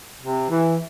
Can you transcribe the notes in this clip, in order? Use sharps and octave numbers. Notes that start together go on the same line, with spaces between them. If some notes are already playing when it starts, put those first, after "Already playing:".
C3
E3